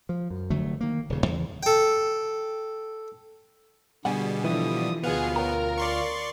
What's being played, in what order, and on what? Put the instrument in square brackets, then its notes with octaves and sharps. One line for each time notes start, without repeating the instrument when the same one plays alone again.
[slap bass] F3
F#2
F1 D3 F#3 A3
D#3 A#3
D#1 C#3
E2 C#3
[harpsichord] A4 G5
[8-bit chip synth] B2 G3 [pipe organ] D3 G#4 [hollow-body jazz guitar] F#5 G#5
[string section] D3 [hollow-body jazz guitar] E3 E4 B4 [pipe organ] F3 D#6
[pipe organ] D2 F4 F6 [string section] B2 G#4 [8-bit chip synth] B3
[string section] A#4 [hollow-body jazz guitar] C#5 G5 A#5
[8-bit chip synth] D5 C6 C#6